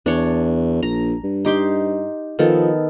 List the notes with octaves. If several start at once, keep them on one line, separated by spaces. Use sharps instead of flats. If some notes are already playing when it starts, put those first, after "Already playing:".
E2 D4 C#5
A#1 A#5
G2
D#4 G4 C6
D#3 F3 B3 A4